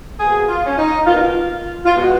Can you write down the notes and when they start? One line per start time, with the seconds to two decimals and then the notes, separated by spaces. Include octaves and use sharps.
0.19 B2 A#3 G#4
0.48 F4
0.66 C#4
0.78 D#4
1.06 B2 A#3 F4
1.15 D#4
1.22 F4
1.85 F4
1.95 B2 G#3 B3 F#4